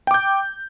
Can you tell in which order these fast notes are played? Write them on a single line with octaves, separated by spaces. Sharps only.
G5 D6 G6